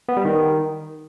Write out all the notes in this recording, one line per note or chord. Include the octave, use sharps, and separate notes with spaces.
B3
G3
D#3